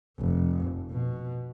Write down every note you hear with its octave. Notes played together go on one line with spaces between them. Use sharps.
F1
B2